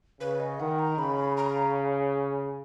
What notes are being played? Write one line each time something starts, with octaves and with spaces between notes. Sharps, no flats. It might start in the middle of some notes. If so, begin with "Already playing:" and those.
C#3 B4
D#5
D#3 F#5
A#5
C#3 B5
A#5